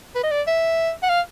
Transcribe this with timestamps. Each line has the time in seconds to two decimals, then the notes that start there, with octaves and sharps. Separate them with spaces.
0.15 B4
0.23 D#5
0.31 D5
0.47 E5
1.03 F#5
1.09 F5